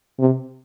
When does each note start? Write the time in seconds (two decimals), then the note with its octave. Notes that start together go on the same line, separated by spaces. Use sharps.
0.19 C3